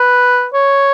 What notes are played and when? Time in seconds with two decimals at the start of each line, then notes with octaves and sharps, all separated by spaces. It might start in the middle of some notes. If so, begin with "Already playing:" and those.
Already playing: B4
0.54 C#5